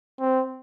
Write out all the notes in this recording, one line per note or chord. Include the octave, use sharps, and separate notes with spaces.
C4